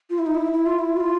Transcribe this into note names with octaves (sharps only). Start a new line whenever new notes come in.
F4
E4
D#4
E4
E4
F4
E4
F#4
F4